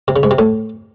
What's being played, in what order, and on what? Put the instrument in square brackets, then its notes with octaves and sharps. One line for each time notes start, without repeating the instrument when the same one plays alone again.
[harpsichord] C3
C#3
G#2
C3
A2